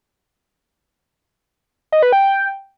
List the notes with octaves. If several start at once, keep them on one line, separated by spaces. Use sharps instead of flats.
D#5
B4
G5